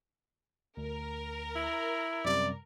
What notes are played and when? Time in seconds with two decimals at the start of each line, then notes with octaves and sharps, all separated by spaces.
0.77 D2 A#4
1.56 E4
2.25 F#2 C3 G3 D5